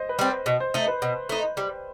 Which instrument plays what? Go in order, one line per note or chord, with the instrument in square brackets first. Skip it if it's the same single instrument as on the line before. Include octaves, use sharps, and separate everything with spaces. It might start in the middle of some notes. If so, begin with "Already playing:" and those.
Already playing: [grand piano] C5 D#5
B4
[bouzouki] G3 C4
[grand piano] C5
[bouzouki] B2 [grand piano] D#5
[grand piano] C5
[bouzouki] A3 D#4
[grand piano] B4
[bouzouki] B2
A3 D#4
G3